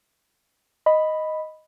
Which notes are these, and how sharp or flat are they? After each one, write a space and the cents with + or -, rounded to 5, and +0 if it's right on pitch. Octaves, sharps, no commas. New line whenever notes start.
D#5 +0 B5 +0